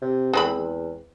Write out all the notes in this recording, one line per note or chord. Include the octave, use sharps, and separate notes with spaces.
C3
E2 G#3 C4 B5
E2